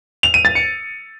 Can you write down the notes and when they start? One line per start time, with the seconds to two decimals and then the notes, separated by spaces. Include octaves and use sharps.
0.23 F7
0.34 D#7
0.45 A6
0.55 C#7